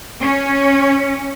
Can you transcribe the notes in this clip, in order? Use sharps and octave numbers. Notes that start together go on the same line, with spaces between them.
C#4